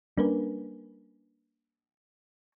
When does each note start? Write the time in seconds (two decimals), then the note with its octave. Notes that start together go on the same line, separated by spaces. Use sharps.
0.17 G3 A#3 C#4 D4 A#4 B4